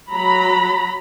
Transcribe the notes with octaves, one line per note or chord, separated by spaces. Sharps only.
F#3 A#5 B5